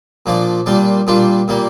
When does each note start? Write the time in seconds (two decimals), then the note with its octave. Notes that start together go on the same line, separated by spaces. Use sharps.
0.26 A#2 F3 A#3 D4
0.66 A#2 G3 D4 F4
1.07 A#2 G3 D4 F4
1.48 A#2 G3 A#3